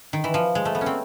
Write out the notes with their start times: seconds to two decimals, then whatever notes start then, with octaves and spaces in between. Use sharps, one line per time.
0.13 D#3
0.24 E3
0.34 F3
0.55 G#3
0.65 A3
0.75 B3
0.81 C#4
0.86 C4